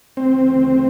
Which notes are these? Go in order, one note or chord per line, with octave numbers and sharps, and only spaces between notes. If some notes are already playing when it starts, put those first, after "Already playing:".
D2 C#3 E3 A3 C4